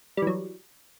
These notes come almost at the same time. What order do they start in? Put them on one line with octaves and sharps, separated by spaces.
G3 E3 F#3